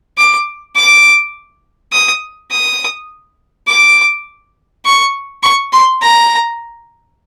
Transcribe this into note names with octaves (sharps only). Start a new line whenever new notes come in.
D6
D6
D#6
D#6
D6
C#6
C#6
C6
A#5